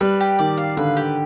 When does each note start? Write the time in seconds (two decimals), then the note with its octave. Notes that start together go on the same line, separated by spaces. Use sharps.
0.01 G3 B4
0.20 G4
0.39 D#3 D5
0.58 F5
0.77 D3 B4
0.97 G4